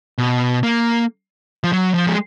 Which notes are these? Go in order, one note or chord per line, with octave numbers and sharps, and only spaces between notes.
B2
A#3
F3
F#3
F3
G#3